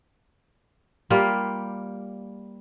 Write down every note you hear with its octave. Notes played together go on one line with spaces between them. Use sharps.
G3 A#3 F4 G4